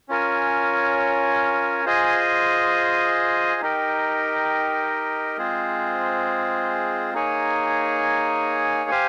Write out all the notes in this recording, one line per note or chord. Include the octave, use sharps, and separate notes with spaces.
C#4 F4 A#4 C#5 G#5
F4 G#4 C5 D#5 G#5
D#4 G4 A#4 D#5 G5
G#3 C4 F4 G#4 C5
A#3 D#4 G#4 C#5 G#5
G4 C5 F5 G#5